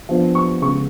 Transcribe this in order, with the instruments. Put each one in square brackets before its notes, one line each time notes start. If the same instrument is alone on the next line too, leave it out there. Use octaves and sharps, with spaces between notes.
[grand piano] F3 B3 D4
C#6
C#3 G#3 B3 C#6